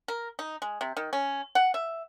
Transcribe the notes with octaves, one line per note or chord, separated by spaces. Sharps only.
A#4
D#4
G#3
C3
D#3
C#4
F#5
E5